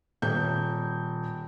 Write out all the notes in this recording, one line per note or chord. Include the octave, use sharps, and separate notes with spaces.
D#1 G6